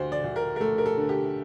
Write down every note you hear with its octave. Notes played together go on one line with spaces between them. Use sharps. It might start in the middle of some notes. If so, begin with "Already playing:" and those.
Already playing: D2 D3 C5
D5
D2
A#4
A#4
A3 A4
A#4
A4
D3
G4